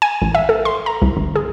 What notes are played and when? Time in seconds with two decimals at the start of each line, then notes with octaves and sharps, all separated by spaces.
0.02 G#5
0.22 A1
0.35 E5
0.49 A4
0.65 C6
0.86 A#5
1.02 C2
1.17 G1
1.36 G#4